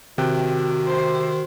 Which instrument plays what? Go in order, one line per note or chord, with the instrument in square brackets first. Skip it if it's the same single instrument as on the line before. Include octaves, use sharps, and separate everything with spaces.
[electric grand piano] C3 G5 F#6 [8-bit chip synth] D#3 [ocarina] F#4
[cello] C5